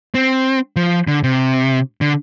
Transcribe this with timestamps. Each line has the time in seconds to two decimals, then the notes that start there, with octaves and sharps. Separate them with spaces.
0.15 C4
0.76 F3
1.08 D3
1.23 C3
2.01 D3